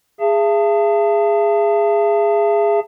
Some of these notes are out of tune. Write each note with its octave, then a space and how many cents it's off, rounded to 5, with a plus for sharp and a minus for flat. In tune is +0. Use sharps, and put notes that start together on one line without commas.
G#4 -10 E5 +45 A5 +20